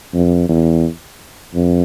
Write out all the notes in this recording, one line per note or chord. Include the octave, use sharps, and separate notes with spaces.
F2
E2
F2